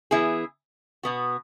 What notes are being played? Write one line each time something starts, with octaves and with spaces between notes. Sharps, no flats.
E3 B3 E4 G#4
B2 B3 F#4